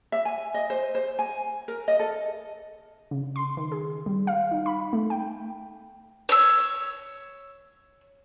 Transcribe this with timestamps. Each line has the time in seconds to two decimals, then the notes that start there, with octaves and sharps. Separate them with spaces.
0.12 E5
0.25 G#5
0.54 D#5
0.70 C5
0.95 C5
1.19 G#5
1.68 A#4
1.88 D#5
1.99 A4
3.11 C#3
3.36 C6
3.57 D#3
3.72 G#4
4.06 G3
4.27 F5
4.51 D#4
4.66 B5
4.93 A3
5.10 G5
6.29 C#5 E6